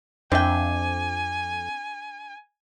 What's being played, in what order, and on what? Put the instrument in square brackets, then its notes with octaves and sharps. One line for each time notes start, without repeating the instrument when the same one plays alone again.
[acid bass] F2 [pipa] C4 G5 [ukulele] D4 E5 [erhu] G#5